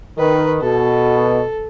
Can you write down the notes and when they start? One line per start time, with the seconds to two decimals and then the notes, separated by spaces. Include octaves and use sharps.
0.18 D#3 B4
0.62 B2 A4